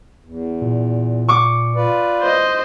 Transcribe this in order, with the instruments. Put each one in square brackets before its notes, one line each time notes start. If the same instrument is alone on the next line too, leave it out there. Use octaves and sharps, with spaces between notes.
[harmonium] E2
[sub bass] A#2
[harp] C#6 D6
[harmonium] F4 B4 D5
[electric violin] C5 D#5